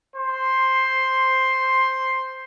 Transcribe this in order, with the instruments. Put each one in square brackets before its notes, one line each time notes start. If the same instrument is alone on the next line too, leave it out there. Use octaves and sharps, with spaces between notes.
[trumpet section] C5 C6